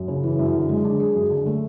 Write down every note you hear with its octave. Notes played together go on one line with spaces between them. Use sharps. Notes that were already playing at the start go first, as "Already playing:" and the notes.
Already playing: F#2
C#3
E3
F#2
D3
G#3
D4
G#4
F#2
D3
A3